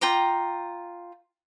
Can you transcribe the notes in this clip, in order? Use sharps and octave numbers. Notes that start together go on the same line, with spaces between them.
F4 G5 A#5 D6